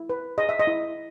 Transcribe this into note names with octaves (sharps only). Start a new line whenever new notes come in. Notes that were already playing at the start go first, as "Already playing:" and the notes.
Already playing: E4
B4
G#4 D#5
E5
D#5
E4